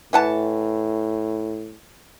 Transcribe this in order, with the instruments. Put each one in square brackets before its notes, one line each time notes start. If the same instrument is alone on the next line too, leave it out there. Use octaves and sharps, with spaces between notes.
[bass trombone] A2 [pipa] E3 F#5 A5